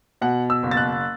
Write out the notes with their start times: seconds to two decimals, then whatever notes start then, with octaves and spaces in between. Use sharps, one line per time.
0.21 B2 F#5
0.50 E6
0.63 F#1
0.71 A6
0.77 F#6